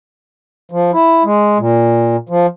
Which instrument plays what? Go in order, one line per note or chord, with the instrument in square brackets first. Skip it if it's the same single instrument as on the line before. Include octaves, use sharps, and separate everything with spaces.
[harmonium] F3
E4
G#3
A#2
F3